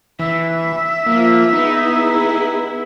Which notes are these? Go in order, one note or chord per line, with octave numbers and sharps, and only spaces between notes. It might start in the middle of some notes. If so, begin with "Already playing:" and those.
E3 E5
F3 A#3 F4
B3 D#4 E4 G#4